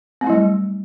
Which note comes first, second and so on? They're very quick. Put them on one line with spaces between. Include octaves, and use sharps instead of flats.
C4 A3 E4 F#3 G3